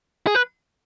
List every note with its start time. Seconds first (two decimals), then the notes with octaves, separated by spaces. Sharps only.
0.27 G#4
0.35 B4